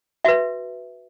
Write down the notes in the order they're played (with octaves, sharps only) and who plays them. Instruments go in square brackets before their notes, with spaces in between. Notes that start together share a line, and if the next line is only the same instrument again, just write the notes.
[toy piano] F#4 B4 E5